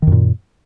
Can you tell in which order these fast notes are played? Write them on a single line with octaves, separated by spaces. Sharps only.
D#3 F#2 A#2